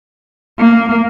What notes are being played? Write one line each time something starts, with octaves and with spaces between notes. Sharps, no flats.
A#3